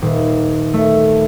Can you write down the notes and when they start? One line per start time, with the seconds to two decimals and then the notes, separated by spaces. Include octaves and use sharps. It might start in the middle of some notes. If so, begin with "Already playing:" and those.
0.02 D#1
0.74 A3